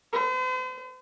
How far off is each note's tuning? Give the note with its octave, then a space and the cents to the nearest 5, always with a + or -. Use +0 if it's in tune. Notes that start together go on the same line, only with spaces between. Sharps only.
C5 -45